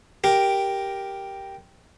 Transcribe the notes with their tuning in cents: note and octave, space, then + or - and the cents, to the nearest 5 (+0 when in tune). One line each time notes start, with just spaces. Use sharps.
G4 +0 A#4 +5